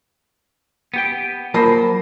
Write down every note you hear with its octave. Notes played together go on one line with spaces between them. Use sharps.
B3 G4 G5
F#3 A#3 F4 A#4 C5 A5 B5 A#6